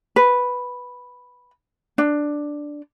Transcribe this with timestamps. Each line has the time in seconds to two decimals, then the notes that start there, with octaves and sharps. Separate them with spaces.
0.16 B4
1.98 D4